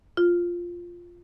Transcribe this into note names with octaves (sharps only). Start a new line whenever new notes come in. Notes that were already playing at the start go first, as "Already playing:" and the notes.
F4